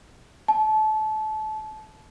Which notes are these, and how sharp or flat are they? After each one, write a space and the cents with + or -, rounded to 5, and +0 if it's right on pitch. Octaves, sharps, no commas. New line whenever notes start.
A5 -25